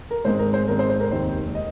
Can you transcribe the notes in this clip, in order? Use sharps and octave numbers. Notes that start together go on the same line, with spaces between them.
A#4
G#1 G#2 G#3 C4 C5
A#4
C5
G#1 G#2 G#3 C4 A#4
C5
C5
A#4
F1 D#2 D#3 G#3 C4 C5
D#5